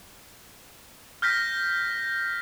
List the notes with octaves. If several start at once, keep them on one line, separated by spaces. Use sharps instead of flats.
F6 G6 A#6 B6